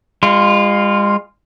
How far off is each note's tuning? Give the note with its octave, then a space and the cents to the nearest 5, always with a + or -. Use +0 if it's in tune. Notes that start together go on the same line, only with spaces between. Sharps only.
G#3 -40 F4 +0